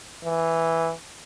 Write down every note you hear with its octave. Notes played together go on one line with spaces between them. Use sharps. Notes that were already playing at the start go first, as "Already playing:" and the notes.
E3